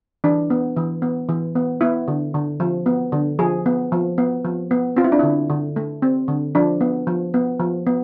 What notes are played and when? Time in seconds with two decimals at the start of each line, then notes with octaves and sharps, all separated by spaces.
0.24 E3 D4
0.50 B3
0.76 E3
1.02 B3
1.29 E3
1.55 B3
1.81 B3 E4
2.08 D3
2.35 D3
2.60 F3
2.86 B3
3.12 D3
3.39 F3 G#4
3.66 B3
3.92 F3
4.18 B3
4.45 F3
4.71 B3
4.96 C4 F4
5.04 E4
5.12 D4
5.19 D3 E4
5.50 D3
5.76 A3
6.02 C4
6.28 D3
6.55 F3 D4
6.81 B3
7.07 F3
7.34 B3
7.60 F3
7.87 B3